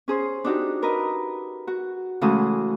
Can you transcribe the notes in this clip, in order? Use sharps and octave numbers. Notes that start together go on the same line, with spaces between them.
C#4 G#4 C5
D4 D#4 F#4 G4
A#4 B4 D#5
F#4
C#3 E3 G#3 A3 F#4 D#6